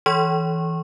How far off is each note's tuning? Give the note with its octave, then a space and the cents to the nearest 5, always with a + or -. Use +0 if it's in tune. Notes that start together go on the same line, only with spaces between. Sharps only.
E3 +0 C#5 +0 C#6 -30